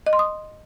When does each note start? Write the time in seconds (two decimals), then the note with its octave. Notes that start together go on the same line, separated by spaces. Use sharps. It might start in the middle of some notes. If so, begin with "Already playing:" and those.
0.06 D#5
0.13 C6
0.19 D#6